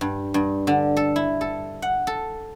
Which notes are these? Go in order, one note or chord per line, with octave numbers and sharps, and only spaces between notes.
G2
G2
D3
A4
E4
A4
F#5
A4